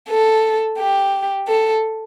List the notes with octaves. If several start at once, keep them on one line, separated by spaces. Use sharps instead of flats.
A4
G4
A4